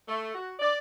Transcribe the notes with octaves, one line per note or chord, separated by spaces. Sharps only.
A3
F#4
D5